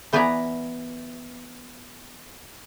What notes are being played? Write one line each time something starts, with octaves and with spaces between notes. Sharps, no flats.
E3 B3 B4 D5 G#5 A#5